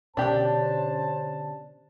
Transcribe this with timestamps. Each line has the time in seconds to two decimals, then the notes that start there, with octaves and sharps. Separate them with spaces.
0.17 B2 D3 C#4 D4 G4 C5 A5